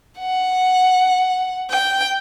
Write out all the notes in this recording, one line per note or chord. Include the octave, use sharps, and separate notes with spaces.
F#5
G5